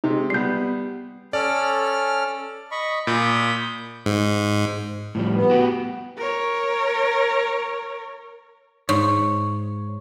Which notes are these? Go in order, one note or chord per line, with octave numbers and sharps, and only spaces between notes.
C3 G#3 D#4
G3 B3 G6 C7
C#4 A4 D5 F6
D#5 B5 C#6
A#2 B5 D#6 G6
G#2
A2 F3 G3
B3
F#4 G4 B4
A#4 C#5
G#2 C#5